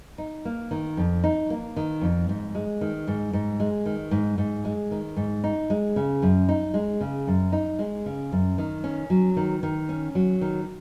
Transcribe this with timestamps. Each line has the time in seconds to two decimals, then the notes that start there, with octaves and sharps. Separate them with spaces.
0.18 D#4
0.45 A#3
0.71 D#3
0.97 F2
1.24 D#4
1.50 A#3
1.76 D#3
2.02 F2
2.29 G#2
2.55 G#3
2.81 D#3
3.07 G#2
3.33 G#2
3.60 G#3
3.86 D#3
4.11 G#2
4.38 G#2
4.65 G#3
4.91 D#3
5.17 G#2
5.44 D#4
5.70 G#3
5.96 C#3
6.22 F#2
6.49 D#4
6.74 G#3
7.01 C#3
7.27 F#2
7.52 D#4
7.79 G#3
8.06 C#3
8.32 F#2
8.58 D#3
8.84 C#4
9.10 F#3
9.36 D#3
9.63 D#3
9.89 C#4
10.15 F#3
10.41 D#3